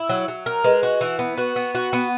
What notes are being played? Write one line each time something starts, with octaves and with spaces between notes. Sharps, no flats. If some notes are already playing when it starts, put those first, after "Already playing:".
Already playing: E4
F#3
F#3
A#4
G#3 B4
F#4
E3
B3
F#4 B4
B3
F#4
B3